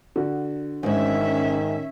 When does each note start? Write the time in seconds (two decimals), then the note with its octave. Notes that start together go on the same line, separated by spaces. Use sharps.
0.16 D3 F#4
0.83 E2 G#2 D#3 C#4 E5